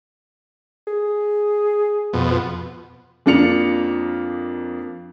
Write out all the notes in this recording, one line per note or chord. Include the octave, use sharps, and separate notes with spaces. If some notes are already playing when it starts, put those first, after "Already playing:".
G#4
F2 B2
F2 A#3 D4 F4 C#7 F7